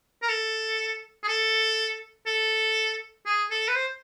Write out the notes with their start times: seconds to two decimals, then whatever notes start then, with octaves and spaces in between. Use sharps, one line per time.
0.22 A#4
0.29 A4
1.23 G#4
1.28 A4
2.26 A4
3.26 G#4
3.51 A4
3.68 B4
3.75 C5